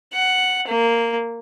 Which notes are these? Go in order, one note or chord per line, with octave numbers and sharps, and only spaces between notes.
F#5
A#3